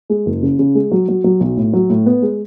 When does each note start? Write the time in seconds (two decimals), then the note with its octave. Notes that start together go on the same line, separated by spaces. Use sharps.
0.10 G#3
0.26 F#1
0.43 C#3
0.59 C#3
0.75 G#3
0.91 F#3
1.08 F#3
1.24 F#3
1.40 B1
1.57 A2
1.73 F#3
1.89 A2
2.06 B3
2.22 G#3